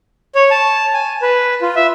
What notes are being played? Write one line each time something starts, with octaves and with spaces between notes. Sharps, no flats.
C#5
A5
G#5
B4
F4
E5